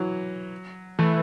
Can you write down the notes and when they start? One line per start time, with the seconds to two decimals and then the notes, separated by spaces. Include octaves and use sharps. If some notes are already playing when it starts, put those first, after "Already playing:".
Already playing: E3 F#3
0.99 E3 A3